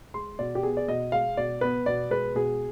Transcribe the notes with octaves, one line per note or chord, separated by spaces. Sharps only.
G#3 C6
B2 D5
G4
B3 G#4
D5
B2 D#5
G#3 F5
B2 D5
B3 B4
B2 D5
G#3 B4
B2 G#4